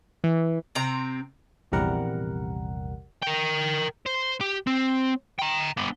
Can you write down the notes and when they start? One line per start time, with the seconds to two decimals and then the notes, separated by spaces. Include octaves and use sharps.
0.24 E3
0.75 C3 C4 A#5
1.72 A#1 E2 C3 G3 A#4 F#5
3.22 A#4 G5
4.06 C5
4.41 G4
4.67 C4
5.39 G5 A#5
5.77 B3 D4